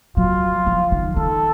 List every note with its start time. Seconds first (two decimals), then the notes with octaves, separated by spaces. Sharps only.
0.17 F#3 F4
0.66 F3
0.92 D#3
1.16 D#3 A4